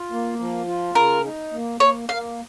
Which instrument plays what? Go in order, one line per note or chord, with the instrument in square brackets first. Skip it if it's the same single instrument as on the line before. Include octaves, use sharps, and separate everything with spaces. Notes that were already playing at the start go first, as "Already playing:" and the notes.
Already playing: [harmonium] F4
A#3
F3
F4
[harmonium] C#3 [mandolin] A#4
[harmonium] D#4
A#3
[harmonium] A#3 [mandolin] C#5
[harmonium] A#3 [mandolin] F5